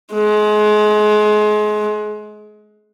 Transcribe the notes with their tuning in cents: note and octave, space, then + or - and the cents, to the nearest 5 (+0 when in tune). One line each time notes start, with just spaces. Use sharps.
G#3 +30